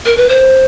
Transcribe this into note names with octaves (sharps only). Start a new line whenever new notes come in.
A#4
B4
C5